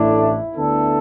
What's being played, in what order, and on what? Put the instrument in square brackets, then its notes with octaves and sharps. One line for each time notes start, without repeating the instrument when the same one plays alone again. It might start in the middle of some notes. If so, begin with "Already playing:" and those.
Already playing: [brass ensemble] A1 A2 A3 D4 [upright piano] E4
[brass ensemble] D2 D3 B3 D4 A4